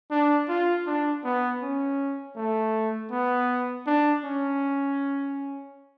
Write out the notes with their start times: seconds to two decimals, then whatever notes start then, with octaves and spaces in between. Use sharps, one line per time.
0.11 D4
0.48 F4
0.86 D4
1.24 B3
1.62 C#4
2.36 A3
3.11 B3
3.87 D4
4.24 C#4